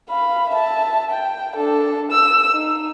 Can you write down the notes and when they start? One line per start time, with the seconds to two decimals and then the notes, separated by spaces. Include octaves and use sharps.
0.10 F5 B5
0.50 E5 A5
1.11 G5
1.55 D4 A4
2.11 E6
2.53 D#4